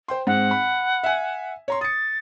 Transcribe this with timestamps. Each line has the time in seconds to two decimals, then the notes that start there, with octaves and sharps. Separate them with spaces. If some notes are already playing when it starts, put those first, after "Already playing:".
0.08 C5 G5 C6
0.27 G#2 C4 F#5
0.51 B5
1.03 E5 G#5
1.68 C#5 A#5 C6
1.81 D#6 A6 C#7